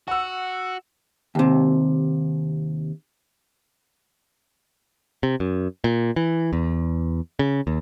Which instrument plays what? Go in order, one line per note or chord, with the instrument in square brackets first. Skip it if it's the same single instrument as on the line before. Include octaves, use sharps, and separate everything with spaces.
[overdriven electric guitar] F#4 [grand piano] F#5 E6
[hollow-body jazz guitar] D#2 C3
[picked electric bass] C3
F#2
A#2
E3
E2
C#3
D#2